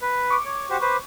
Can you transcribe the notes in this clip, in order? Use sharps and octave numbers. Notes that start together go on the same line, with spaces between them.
B4
C#6 D6
C#5
F#4 G4 C5
B4 C5